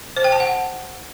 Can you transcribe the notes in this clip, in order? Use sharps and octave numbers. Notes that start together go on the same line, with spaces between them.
C5
G5
A5
F#5